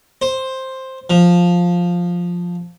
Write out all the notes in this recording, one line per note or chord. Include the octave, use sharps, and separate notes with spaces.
C5
F3